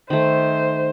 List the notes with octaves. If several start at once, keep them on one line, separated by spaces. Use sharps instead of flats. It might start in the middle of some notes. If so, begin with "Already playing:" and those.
D#3 A3 C5